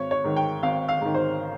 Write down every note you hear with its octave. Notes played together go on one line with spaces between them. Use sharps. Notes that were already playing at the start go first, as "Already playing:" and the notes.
Already playing: G#1 C#5
C#5
G#2 D#3
G5
G#1 F5
F5
G#2 D#3
C5